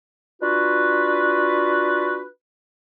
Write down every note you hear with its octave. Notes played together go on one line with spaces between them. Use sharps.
D4 F4 F#4 B4